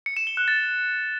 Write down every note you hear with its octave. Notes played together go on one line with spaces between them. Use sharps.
C#7
E7
G7
F#6
A6